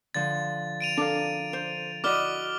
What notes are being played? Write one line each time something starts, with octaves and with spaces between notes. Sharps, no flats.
D3 F3 A6
D7 D#7 F7
D4 A4 A#4 F5
C5
E4 F#4 D5 D#5 D6 F6 G7